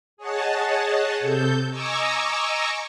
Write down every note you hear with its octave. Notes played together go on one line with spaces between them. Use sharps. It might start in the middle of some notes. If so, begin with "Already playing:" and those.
G#4 C#5 D#5 F#5 A5
C3 A4 G6
D#5 G#5 A#5 C#6 D6 E6